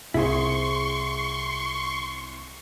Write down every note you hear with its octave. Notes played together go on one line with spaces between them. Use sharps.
C2 E4 G#4 C5 C6 C#6